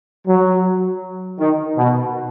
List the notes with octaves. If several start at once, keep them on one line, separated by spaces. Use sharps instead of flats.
F#3
D#3
B2